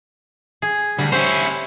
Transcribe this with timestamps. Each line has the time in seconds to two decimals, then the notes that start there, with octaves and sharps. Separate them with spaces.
0.62 G#4
0.99 D2 G3
1.12 C#4 E4 C5